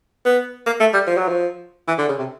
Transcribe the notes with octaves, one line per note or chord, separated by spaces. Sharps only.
B3
A#3
A3
G3
F3
F#3
F3
E3
D3
C#3
C3